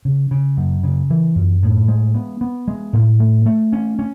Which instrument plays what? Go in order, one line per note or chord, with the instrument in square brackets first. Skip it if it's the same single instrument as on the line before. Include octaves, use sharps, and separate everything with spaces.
[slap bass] C#3
C#3
F#2
C#3
E3
F#2
A2
G#3
B3
B3
G#3
A2
A3
A3
C#4
C#4